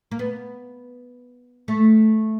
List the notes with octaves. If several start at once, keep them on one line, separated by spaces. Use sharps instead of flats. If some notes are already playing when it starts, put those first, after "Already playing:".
A#3
B3
A3